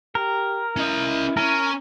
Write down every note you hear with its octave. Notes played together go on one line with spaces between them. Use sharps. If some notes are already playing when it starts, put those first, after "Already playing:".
G4 A#4
C#4 E4 D#5
C#4 A#4